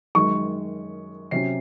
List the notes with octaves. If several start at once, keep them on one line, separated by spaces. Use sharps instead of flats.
F#2 D#3 G#3 C#6
C3 F#3 C#4 C7